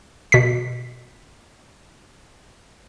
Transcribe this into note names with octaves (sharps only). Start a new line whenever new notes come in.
B2 B6